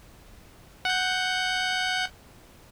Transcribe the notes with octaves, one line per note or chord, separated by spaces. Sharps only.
F#5 G6